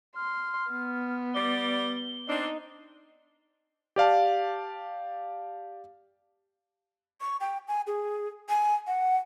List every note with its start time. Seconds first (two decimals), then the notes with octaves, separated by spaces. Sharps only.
0.16 C6 F6
0.71 B3
1.34 G3 D5 G7
1.96 G7
2.28 C4 D4 D#4
3.96 G4 D5 F5 A5
7.21 C#6
7.41 G5
7.68 G#5
7.87 G#4
8.49 G#5
8.87 F#5